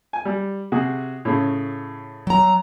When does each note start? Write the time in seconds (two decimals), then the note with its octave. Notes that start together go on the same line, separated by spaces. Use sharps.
0.13 G#5
0.25 G3
0.72 C3 F#4 G#4
1.25 A2 C#3
2.27 F#3 A#5